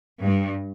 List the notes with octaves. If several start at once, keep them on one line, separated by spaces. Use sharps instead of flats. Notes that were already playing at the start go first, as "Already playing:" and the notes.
G2